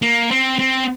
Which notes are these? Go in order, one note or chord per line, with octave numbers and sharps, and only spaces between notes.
A#3
C4
C4